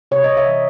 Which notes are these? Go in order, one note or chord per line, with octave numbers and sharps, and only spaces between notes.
C3 C#5
C3 D#5
E5
E3